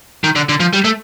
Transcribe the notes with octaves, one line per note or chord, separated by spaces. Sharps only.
D#3
D3
D3
F3
G3
A3